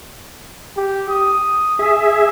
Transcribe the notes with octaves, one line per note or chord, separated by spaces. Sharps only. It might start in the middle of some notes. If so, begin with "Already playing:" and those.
G4
D#6
G#4 E5